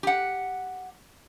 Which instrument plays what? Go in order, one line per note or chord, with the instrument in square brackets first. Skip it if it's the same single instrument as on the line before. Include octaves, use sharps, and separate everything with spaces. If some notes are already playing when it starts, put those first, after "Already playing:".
[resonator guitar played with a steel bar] G4 F#5